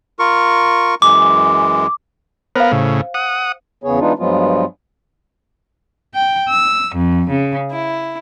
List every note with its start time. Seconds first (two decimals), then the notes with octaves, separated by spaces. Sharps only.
0.19 F4 A#4 C#6
1.02 F#2 E3 G#3 D6
2.56 B3 A#4 C5 F5
2.72 A2 C#3
3.14 F#5 D#6
3.84 E2 C#3 B3 G#4 C#5
4.00 E3 G#3 B3 D4 D#4 F4
4.19 G2 F3 F#3 G#3 B3 F4
6.13 G5
6.50 E6
6.95 F2
7.31 C#3
7.71 E4